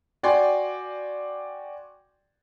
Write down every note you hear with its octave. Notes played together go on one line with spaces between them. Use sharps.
F#4 D5 G5 G#5 C6